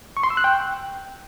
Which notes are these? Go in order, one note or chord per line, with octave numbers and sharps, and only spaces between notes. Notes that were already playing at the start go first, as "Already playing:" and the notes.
C#6
C6
E6
F#6
G5